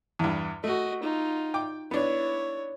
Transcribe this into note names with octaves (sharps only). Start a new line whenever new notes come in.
E2 G2
A3 F#4 D#5
D#4 F4
G5 D6
B3 D4 E4 C#5